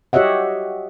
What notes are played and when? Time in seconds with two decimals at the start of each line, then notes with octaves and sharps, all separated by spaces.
0.13 F#4 G4 C#5 D#5 E5 F#5